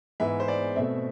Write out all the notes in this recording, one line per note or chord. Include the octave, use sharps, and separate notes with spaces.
G#2 E3 B3 E5
C5
D5
B2 A3 C4 E5